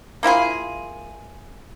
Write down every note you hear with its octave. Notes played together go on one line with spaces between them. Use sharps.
A#3 E4 F4 G#4